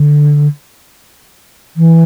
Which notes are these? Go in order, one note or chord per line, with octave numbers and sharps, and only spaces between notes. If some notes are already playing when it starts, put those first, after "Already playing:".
Already playing: D3
E3